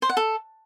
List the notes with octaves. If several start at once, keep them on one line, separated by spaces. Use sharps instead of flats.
C5
F#5
A4